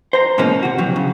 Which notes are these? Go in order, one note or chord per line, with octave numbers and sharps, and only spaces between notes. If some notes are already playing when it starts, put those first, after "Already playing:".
C5 A#5
G#2 B2 E3 G#3 A#3 C#4
C3 F#4
C3 E3 F#3
C#3 F#3